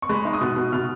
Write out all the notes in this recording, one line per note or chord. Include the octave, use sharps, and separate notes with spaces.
C#6
G#3 B5
D#4
D#6
B2
B2
B2 F6